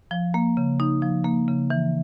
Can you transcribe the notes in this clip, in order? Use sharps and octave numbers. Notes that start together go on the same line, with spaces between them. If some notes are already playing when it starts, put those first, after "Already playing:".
F3
A#3
C#3
D#4
F3
A#3
C#3
E3